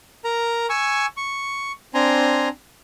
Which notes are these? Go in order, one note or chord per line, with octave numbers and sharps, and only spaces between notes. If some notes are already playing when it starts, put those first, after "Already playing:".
A#4 A#5
G#5 C#6 E6
C#6
C4 D4 G#5 A#5 C6